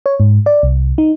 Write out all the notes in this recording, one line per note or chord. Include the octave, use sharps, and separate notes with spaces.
C#5
G#2
D5
C2
D#4